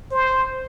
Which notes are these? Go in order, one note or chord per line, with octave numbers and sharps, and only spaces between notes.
C5